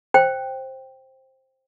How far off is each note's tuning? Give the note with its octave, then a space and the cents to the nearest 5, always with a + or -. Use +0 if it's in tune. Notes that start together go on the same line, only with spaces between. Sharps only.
C5 +10 G5 +0